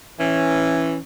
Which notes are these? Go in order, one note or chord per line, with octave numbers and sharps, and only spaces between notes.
E3 C#4